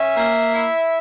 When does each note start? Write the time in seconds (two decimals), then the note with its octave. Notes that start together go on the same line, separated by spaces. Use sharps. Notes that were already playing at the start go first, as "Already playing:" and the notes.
Already playing: C#4 E5
0.16 A#3
0.53 E4